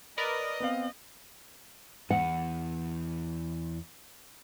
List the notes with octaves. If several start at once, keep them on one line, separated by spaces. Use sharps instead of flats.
A#4 B4 D5 D#5
B3 C4 F5
E2 F#5